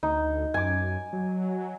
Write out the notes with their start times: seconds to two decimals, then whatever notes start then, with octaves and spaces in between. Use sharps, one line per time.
0.03 D2 D#4
0.54 F#2 G#5 D6
1.13 F#3